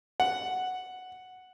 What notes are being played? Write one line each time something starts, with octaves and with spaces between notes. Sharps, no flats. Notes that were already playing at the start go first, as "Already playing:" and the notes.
F#5